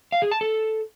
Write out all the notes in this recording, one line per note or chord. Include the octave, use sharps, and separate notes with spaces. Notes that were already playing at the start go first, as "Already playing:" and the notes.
F5
G#4
A5
A4